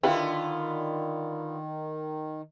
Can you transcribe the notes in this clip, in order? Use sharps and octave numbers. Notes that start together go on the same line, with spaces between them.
D3 D#3 B3 E4 F4 G4 B4